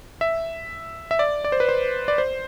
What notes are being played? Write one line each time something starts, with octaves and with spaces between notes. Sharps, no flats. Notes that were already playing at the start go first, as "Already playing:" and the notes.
E5
E5
D5
D5
C5
B4
C5
D5
C5